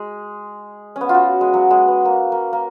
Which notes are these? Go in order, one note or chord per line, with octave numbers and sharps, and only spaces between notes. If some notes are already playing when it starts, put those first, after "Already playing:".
Already playing: G#3
C#4
B3
F4
F#4
G#3
F#3
G#3
B3
A#3
A#3
A#3